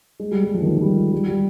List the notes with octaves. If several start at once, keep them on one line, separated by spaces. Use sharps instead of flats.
G#3
G3
G3
F3
D#3
F3
F3
G3
G#3
G3
G3